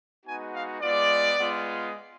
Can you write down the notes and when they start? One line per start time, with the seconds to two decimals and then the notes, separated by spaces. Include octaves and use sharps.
0.25 G#3 B3 D#4 F#4 G#5
0.53 F5
0.81 G#3 B3 F4 D5
1.39 G#3 B3 F4